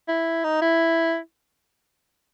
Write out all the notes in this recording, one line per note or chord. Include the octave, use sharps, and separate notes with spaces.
E4
D#4
E4